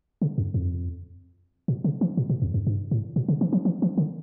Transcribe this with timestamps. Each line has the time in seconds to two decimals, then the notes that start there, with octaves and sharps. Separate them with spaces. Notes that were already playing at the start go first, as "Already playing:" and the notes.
0.22 C#3
0.38 F2
0.54 F2
1.68 A#2
1.84 C#3
2.01 E3
2.17 A#2
2.30 A#2
2.42 E2
2.54 F2
2.67 G2
2.91 A2
3.16 A#2
3.28 C#3
3.41 E3
3.53 F3
3.65 E3
3.82 E3
3.98 D3